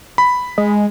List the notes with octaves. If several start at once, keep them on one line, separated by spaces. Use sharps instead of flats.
B5
G#3